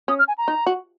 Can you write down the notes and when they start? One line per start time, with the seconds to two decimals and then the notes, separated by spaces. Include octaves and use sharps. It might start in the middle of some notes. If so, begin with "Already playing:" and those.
0.08 C#4 D#6
0.19 F6
0.28 G#5
0.38 A#5
0.48 D#4
0.67 F#4